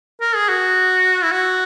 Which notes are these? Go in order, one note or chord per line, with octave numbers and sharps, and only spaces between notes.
A#4
G#4
F#4
E4
F#4